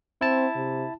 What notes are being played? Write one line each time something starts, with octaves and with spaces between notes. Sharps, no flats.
C4 E4 A5
C3